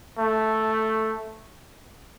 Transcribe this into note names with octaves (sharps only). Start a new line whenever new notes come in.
A3